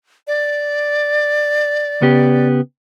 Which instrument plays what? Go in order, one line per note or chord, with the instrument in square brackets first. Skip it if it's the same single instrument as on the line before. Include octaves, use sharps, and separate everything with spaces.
[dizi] D5
[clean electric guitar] C#3 B3 G4